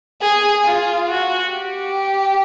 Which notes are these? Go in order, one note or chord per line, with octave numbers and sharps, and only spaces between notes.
G#4
F4
F#4
G4